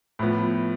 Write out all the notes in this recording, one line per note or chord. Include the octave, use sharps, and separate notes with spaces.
A2 F3 B3